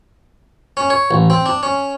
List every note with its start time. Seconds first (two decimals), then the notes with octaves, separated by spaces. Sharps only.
0.77 C#4
0.90 C#5
1.11 A1
1.30 C4
1.46 D4
1.63 C#4